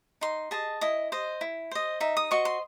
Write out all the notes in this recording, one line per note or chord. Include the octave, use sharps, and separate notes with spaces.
D#4 C6
G#4 D#5 A5
E4 D#5
C5 D#5
E4
C5 D#5
D#4 E5
D#6
F#4 C5 D#5 C#6
C6